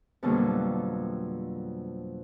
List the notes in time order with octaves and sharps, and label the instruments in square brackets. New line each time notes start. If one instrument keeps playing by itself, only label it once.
[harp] F2 B2 D3 F#3 G3 A#3